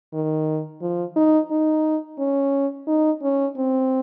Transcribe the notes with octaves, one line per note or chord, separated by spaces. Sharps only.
D#3
F3
D#4
D#4
C#4
D#4
C#4
C4